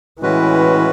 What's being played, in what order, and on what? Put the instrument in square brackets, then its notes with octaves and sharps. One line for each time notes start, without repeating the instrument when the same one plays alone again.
[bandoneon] A2 G#3 C#4 F#4 B4 [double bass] E3